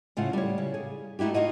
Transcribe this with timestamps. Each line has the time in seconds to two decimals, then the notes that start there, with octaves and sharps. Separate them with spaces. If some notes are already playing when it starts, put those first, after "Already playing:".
0.17 A2 C#3 F4 C5 F#5
0.33 G3 C#5
0.58 C#3
0.74 G#4
1.19 A3 D#4 E4 F#4 G4
1.34 D#4 F4 F#4 D#5